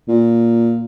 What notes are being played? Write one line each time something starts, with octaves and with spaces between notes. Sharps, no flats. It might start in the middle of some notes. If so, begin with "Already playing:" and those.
A#2